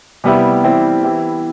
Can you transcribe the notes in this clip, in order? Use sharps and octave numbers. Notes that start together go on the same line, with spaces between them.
C3 G3 B3 E4 G4
E3 G3 C4 E4
E3 B3 E4 G4